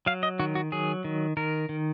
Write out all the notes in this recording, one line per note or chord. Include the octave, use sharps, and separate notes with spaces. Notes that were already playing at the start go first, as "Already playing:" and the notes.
F#3 F5
D#5
D#3 F#4
F#4
F#3 G#4
D#3
D#3 A#4
D#3